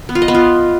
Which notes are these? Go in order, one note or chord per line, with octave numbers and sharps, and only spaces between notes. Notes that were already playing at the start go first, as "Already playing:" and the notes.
B3
F4
D#5
B3
F4